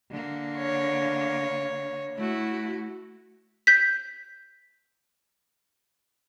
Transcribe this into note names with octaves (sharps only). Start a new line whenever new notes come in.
D3 A#3
C#5
A3 E4 F#4
G6 B6